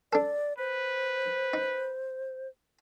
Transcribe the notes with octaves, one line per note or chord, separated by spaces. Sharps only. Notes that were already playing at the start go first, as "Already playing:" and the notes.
D4 A4 D5
B4 C5
D#4